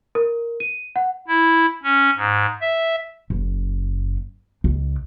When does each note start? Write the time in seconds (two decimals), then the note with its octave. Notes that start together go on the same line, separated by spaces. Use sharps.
0.15 A#4
0.60 D#7
0.96 F#5
1.28 E4
1.83 C#4
2.17 G#2
2.61 E5
3.30 F#1
4.64 C#2